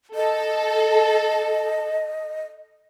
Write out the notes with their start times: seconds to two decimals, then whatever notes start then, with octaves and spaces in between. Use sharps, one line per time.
0.15 A4 D#5